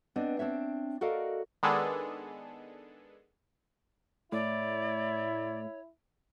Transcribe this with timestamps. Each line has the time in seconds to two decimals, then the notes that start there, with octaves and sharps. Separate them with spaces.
0.16 B3 C4 D4 D#5
0.39 C4 D4 C#5 E5
1.01 F#4 A4 A#4 D5 D#5 F5
1.63 D#3 G#3 B3 D4 G#4 A4
4.32 A2 E4 C#5 D5